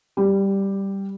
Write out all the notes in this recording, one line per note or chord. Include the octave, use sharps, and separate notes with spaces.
G3